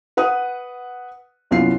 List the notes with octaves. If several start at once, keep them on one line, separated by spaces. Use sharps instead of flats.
B4 F#5 D#6
C2 F#2 B3 F4 C7